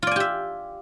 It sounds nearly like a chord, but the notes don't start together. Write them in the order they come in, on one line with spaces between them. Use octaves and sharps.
F4 D5 G#5 G4 E5